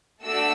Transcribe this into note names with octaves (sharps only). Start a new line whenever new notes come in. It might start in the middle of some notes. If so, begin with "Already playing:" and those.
A3 D4 F#4 A4 E6